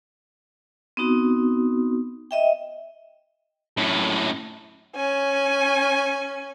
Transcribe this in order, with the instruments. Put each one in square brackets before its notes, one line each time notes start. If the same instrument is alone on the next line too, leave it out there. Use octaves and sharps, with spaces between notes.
[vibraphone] B3 C4 D#4 F#4
D#5 E5 G5
[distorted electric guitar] F#2 A2
[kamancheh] C#4 G#5